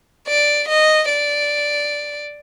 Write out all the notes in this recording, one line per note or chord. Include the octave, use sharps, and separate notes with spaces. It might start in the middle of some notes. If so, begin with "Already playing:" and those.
D5
D#5
D5